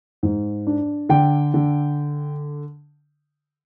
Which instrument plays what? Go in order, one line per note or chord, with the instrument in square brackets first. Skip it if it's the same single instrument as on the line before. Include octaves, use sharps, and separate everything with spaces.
[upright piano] G#2
D4
D3 G5
D3